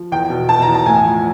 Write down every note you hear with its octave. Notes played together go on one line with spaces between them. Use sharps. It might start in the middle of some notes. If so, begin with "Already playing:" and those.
Already playing: F3
E2 G5
B2
B2 A5
A#5
E2
A5
A2 G#5
F3